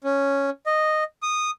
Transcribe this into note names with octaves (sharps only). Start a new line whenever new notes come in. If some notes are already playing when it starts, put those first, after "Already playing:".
C#4
D#5
D#6